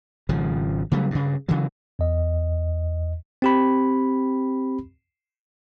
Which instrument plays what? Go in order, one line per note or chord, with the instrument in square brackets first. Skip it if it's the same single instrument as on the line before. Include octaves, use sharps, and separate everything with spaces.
[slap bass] G#1 C#3 F3
C#3 F#3 G3 A3
G2 C#3
C#3 E3 F#3
[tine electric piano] E2 D#5
C4 G4 B5